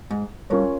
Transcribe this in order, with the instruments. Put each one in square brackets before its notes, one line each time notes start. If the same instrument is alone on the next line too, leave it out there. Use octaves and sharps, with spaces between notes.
[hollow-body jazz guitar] G#2
[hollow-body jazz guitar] G2 [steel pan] C#4 F4 A#4 C#5